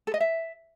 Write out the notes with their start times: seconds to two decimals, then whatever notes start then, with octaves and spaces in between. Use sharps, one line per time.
0.07 A4
0.14 D#5
0.20 E5